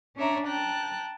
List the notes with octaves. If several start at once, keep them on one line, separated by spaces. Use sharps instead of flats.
C#4 D4 C#5 D5 E5 A#5
G5 A5 A#5 F#6